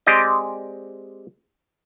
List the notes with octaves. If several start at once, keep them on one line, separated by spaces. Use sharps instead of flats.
G#3 C4 G4 D5 D#5